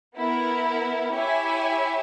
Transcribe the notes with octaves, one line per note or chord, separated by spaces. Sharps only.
B3 E4 A#4
E4 G4 C#5 E5 G#5